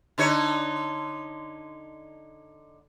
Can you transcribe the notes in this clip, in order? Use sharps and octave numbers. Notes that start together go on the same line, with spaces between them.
D3 D#4 C#5